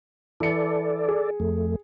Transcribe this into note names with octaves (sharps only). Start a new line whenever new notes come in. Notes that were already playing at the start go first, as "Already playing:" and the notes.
E3 A4 D5 C#7
G#4
F2 A3